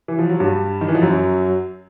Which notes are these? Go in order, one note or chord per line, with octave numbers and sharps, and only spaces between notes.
E3
F3
F#3
G2 G3
D#3
E3
F3
F#2 F#3